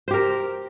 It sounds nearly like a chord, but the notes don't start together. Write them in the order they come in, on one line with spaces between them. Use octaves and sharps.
C5 G4 A#4